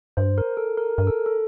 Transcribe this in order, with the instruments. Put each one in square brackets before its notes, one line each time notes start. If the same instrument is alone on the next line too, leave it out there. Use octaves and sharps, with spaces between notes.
[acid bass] G2 [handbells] C5
[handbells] A#4
A4
A#4
[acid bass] G2 [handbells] A#4
[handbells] A4
A4